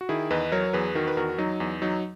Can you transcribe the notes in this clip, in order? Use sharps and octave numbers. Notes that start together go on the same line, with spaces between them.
F#4
D#3 E4 G#4
E2 B4 D#5
F#3 A#4 C#5
E2 G#4 B4
D#3 F#4 A#4
B4
E2 F#4 A#4
F#3 D#4
E2
F#3 D#4